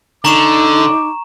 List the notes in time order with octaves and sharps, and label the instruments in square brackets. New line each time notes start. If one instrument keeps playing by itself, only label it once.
[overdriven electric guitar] D3 [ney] D#4 [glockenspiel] A#5 C#6 E7 [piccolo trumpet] D6